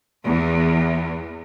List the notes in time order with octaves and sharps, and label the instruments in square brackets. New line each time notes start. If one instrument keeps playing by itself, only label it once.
[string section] E2